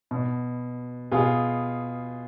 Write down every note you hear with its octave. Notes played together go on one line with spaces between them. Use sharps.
B2
B2 F4 G#4